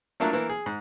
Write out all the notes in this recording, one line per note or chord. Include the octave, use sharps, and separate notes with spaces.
F3 F#3 A3 A#3 D4 E4
E3 A#3
G#4
G#2